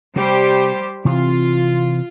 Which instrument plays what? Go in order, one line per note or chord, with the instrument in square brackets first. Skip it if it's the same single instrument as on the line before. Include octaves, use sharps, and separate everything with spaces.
[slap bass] C3 [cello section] G3 G4 C5
[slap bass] C3 E3 C4 [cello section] F4